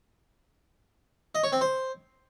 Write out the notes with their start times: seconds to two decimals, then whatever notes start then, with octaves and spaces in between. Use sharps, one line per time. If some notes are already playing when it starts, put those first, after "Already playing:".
1.35 D#5
1.44 C#5
1.52 C4
1.61 C5